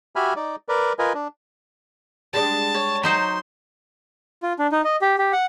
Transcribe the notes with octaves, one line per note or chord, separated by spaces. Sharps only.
F#4 G4 E5 G#5 B5 F6
D#4 D5
A#4 B4 D5
F4 A#4 B4 D#5 G#5
D4
G3 G#3 D4 A5
C#5
F#3 D#4 C5 C6
F4
D4
D#4
D#5
G4
G4
F#5